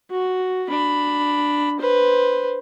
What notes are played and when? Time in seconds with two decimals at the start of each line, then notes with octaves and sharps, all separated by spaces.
0.11 F#4
0.70 D4 B5
1.80 B4 C5